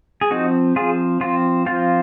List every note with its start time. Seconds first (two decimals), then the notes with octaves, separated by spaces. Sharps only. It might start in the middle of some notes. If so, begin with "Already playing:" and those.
0.21 G#4
0.31 F3 C4 D#4 F#4
0.76 F3 C4 F4 G#4
1.21 F3 C4 F4
1.66 F3 C4 F4